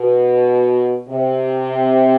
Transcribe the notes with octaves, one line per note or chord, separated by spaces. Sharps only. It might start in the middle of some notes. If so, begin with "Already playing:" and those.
Already playing: B2
C3